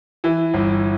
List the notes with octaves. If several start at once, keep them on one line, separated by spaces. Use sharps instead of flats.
E3
G1